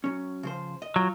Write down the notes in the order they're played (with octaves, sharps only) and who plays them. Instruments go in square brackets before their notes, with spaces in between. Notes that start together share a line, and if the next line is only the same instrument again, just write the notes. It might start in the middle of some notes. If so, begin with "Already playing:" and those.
[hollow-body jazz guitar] F#3 C#4
C#3 F3 C5
D#5
[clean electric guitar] F#3 [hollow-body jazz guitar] F4